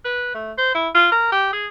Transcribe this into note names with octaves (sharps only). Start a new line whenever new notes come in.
B4
A3
C5
E4
F4
A#4
G4
G#4